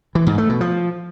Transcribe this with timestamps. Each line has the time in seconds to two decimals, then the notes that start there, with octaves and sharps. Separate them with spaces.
0.15 E3
0.27 G#2
0.38 A3
0.49 B2
0.61 F3